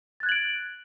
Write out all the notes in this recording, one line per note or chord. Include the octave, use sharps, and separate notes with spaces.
F#6 G#6 A6 D7 F#7